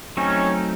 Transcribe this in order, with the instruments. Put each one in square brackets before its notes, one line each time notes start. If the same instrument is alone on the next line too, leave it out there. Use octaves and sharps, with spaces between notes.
[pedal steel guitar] F#3 A3 C4 D#4 [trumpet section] C#4